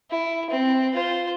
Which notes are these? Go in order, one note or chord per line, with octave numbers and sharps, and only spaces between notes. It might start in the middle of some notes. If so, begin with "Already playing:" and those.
E4
C4
F4 C5